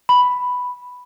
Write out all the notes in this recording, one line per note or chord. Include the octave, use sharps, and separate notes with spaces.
B5